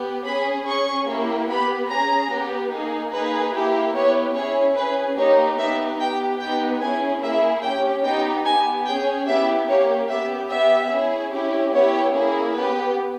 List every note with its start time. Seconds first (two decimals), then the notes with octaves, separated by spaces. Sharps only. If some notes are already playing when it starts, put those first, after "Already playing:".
Already playing: B3 G4
0.25 C#4 G#4 B5
0.67 C#4 G#4 C#6
1.07 A#3 E4 G4
1.48 B3 G4 B5
1.89 C#4 G#4 A#5
2.31 B3 G4
2.72 A#3 D#4 G#4
3.12 A#3 D#4 G#4 B4
3.53 A#3 E4 G4
3.94 B3 E4 G4 C#5
4.35 C#4 E4 G#4 C#5
4.76 C#4 G#4 B4
5.17 A#3 D#4 G4 C#5
5.58 B3 D#4 G4 E5
6.00 B3 G4 G5
6.40 B3 D#4 G4 G5
6.81 C#4 E4 G#4 G#5
7.22 A#3 E4 G#4 E5
7.63 C#4 G4 G5
8.04 B3 D#4 G4 G5
8.45 B3 G4 G#5
8.86 C#4 G#4 G5
9.27 B3 E4 G4 E5
9.68 A#3 C#4 G4 C#5
10.09 B3 G4 E5
10.50 B3 G4 E5
10.91 C#4 E4 G#4
11.32 C#4 E4 G4
11.73 B3 E4 G4 C#5
12.14 A#3 C#4 E4 G#4
12.55 B3 G4 B4